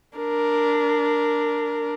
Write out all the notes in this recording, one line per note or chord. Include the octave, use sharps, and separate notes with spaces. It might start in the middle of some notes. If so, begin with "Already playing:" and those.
D4 A#4